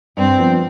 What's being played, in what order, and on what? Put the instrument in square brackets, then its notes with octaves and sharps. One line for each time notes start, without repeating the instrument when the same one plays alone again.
[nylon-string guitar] G2 [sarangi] C4
[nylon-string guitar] F3 B3